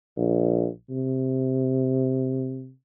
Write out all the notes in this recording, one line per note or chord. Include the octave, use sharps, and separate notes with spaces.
A#1
C3